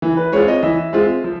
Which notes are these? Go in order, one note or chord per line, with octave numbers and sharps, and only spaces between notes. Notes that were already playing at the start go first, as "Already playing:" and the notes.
E3
B4
G#3 C4 F4 C#5
D#5
E3 E5
G#3 C4 F4
F3